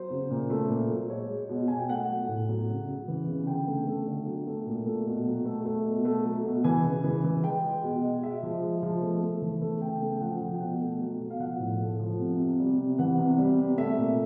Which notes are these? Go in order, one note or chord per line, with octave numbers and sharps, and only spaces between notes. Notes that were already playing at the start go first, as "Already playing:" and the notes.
Already playing: F#3 C5
C#3
A#2
A3
A#2
F#3
G#3 C#5
G#3
B2
B2 G#5
G5
A3 F#5
F#3
A2
F#3
C#3
C#3
E3
C#3
D3 G5
A3
A3
D3
F#3
A3
A#2
A3
B2
F#3
A3
A3
B2
A3
F#3
B2
E3 G#5
C#3
E3
E3
G#3 G5
G#3
B2
G#3
G#3 E5
F3
G#3
F3
A3
A3
E3
A3
C#3 G5
A3
G5
F3 F#5
F3
G5
B2 F#5
A3
F#3
B2
F5
F3 F#5
A2
A3
F3
C3
C3
G3
C3
E3 F#5
C3
G3
C3
A3 E5
A#2